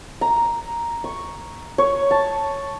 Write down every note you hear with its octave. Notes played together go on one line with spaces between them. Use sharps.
A#5
C#6
C#5
A5